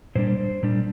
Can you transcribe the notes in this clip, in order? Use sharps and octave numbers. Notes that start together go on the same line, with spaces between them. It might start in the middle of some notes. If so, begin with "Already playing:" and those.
A#2 G3 D4 C5
A#2 G3 D4